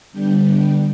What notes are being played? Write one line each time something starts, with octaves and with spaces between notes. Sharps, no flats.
D3 G3 B3 D4 G5
G5